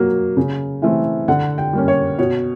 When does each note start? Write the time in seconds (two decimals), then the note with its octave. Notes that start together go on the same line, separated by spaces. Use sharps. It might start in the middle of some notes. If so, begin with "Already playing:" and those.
Already playing: F#3 A#3
0.37 C#3
0.82 E3 A3 C4
1.28 D3 F#5
1.58 G5
1.73 G3 A#3 C#4
1.88 C#5
2.18 B2 C#5